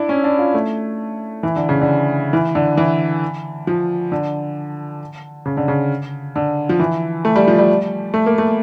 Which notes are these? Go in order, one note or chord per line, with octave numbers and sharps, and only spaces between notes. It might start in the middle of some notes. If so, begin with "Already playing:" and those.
Already playing: D4 E4
C#4
D4
F4
A3
E3
D3
C#3
D3
E3
D3
E3
F3
D3
C#3
D3
C#3
D3
F3
E3
A3
G3
F3
G3
A3
A#3
A3